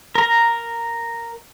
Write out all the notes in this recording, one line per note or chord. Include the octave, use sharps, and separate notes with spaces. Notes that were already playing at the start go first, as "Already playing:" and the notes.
A#4 A#5